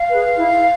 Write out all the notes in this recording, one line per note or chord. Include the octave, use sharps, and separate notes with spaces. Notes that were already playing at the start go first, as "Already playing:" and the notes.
Already playing: F5
G#4 B4
E4